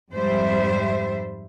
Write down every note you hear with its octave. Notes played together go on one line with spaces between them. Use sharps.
F2 G#2 G3 C5 E5